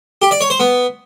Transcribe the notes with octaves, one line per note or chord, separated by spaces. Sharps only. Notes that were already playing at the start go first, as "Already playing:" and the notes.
G4
D5
C#5
C5
B3